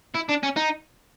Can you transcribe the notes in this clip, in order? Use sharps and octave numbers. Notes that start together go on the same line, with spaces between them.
E4
D4
C#4
D#4